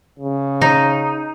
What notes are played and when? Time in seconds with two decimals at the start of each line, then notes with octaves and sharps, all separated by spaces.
0.19 C#3
0.62 D#4